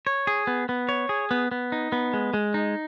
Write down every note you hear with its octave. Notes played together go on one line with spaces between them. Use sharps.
C#5
G#4
B3
B3
C#5
G#4
B3
B3
D#4
B3
G#3
G#3
D#4